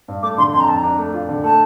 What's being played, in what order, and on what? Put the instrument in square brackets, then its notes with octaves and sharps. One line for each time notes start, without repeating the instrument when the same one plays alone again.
[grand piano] G2
[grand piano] A3 [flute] D6
[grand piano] D3 [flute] C6
[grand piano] F2 [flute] C6
[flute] A#5
[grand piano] F2 [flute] A5
[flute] A#5
[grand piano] D4
A3
F4
D3
[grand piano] A3 [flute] A5